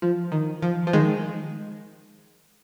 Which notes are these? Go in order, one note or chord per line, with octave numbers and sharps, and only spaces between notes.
F3
D#3
F3
F3
D#3 G#3